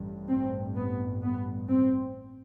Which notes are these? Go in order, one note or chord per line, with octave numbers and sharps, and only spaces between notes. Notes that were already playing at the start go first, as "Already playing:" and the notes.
Already playing: A1 G2
C4
B3
B3
C4